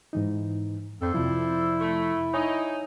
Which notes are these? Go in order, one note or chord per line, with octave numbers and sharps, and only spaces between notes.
G#2 E3 D#4
F2 A4 C5 D5
F2 C3 F3 E4
A3
D#4 C#5 G#5